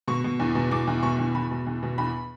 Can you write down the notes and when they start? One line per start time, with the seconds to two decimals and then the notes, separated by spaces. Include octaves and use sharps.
0.08 B2 C#6
0.24 B2
0.39 E2
0.55 B2
0.71 B2 D6
0.87 E2
1.03 B2 C#6
1.19 E2
1.34 E2 B5
1.51 B2
1.66 E2
1.83 B2
1.98 E2 B5